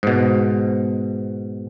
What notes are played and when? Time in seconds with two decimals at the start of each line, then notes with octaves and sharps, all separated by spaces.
0.03 G#2 B2